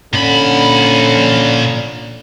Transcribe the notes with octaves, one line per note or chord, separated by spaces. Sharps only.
A#2 D3 C#4 B5